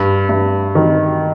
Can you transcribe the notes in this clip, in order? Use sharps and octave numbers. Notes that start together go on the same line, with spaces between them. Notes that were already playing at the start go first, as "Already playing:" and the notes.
Already playing: G2
G2
D#3